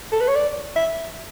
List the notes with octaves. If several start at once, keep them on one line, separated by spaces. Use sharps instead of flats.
A4
B4
C#5
D5
E5